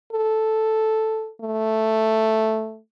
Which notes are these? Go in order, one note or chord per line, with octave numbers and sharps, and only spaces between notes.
A4
A3